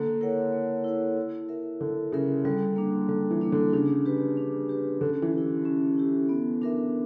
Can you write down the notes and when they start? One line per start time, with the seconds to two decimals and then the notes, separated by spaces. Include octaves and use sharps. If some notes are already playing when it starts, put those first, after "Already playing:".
Already playing: D3 A#3
0.21 E4 A#4 C#5 F#5
0.52 A#3
0.84 E4 A#4 C#5 F#5
1.17 E4
1.49 A#4 E5
1.81 D3 E4
2.12 C#3 A#4 E5
2.45 D3 G3
2.76 A#3 D4
3.08 D3 G3
3.30 E3
3.41 A#3 D4
3.52 D3
3.73 C#3 D4
4.06 G4 B4
4.37 D4
4.69 G4 B4
5.01 D3 C#4
5.22 E3
5.34 E4 G4
5.65 C#4
5.97 E4 G4
6.29 B3
6.62 D4 A#4 E5